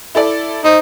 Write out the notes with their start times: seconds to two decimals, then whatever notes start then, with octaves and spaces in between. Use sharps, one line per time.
0.15 E4 A4 D5
0.64 D#4 C5